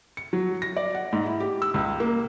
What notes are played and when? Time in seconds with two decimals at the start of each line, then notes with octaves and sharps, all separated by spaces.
0.17 C#7
0.33 F#3
0.62 A#6
0.77 D5
0.95 F#5
1.13 G#2
1.26 E4
1.40 G4
1.62 E6
1.74 C#2
2.00 A#3